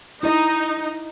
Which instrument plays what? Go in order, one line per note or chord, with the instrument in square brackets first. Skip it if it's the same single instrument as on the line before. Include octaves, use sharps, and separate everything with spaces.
[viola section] D#4 [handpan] E4 D#5